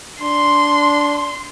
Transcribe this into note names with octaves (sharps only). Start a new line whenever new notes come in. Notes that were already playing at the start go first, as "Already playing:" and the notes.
D4 C6